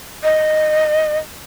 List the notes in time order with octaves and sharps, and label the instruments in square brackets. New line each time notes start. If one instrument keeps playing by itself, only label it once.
[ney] D#5